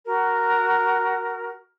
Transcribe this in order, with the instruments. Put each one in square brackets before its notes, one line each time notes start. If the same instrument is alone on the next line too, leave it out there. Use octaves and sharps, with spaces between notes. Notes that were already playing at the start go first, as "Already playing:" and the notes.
[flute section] F#4 A#4